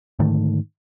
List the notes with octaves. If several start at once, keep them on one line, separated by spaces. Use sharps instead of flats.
G#2 D3 D#3 A3